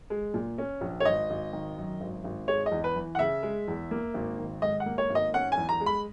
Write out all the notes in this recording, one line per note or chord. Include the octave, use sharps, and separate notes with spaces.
G#3
A#2
C#4
A#1
C#5
G#1 D#5
G#1
D#3
F#2
G#1
G#1
G#3 C#5
D#5
E2
B4
E3
F#5
C#3 E5
G#3
E2
A#3
G#1
D#3
G#2 D#5
F#5
A#3
C#5
G#1
D#5
C#4 F#5
G#5
E2
A#5
G#3
B5